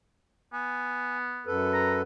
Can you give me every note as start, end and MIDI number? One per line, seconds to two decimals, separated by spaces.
0.53 1.54 59
0.53 1.17 80
1.46 2.02 42
1.46 2.02 69
1.46 2.02 71
1.74 1.95 82